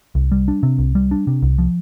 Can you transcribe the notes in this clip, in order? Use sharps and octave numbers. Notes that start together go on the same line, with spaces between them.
C2
G3
D4
C3
C2
G3
D4
C3
C2
F3